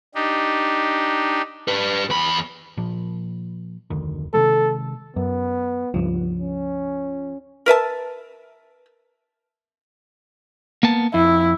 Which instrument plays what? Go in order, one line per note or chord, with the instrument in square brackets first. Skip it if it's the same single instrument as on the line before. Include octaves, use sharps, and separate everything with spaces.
[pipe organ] D4 D#4 G4
[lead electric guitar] G4 B4
E2 B5
[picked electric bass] A#2 F3
F1 D2 D#3
[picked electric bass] C3 D#3 G#3 [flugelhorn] A4
[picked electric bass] F#2 [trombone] B3
[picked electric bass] C#2 G2 [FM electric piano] F3
[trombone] C#4
[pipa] A#4 B4 E5 A5
[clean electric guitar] A#3 B3 A5
[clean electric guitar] F2 [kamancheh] E4